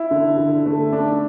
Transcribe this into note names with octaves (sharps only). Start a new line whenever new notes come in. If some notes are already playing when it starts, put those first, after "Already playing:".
Already playing: E4
D3
D3
A3
D4